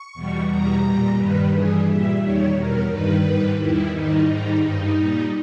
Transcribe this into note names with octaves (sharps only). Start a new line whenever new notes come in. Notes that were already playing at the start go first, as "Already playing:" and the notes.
Already playing: C#6
E2 B2 G3
E2 B2 G3 A#5
A#2 G3
G2 D#3 G3 B4
G2 E3 G3 G#4
A#2 G3 E5
E2 D#3 G3 C#5
E2 B2 G3 A#4
G2 D#3 G3 B4
G#2 D#3 G3
E2 D#3 G3 E4
G#2 D#3 G3 D#4
G#2 D#3 G3 D#4
G2 G3 D#4
A#2 G3